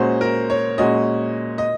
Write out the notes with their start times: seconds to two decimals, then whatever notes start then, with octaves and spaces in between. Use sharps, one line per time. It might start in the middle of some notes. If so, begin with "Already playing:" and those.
Already playing: A#2 G#3 C#4 F#4 C5
0.21 A#4
0.50 C#5
0.78 A#2 G#3 C#4 F#4 D#5
1.58 D#5